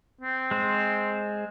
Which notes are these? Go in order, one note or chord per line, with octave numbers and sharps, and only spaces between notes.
C4
G#3 C5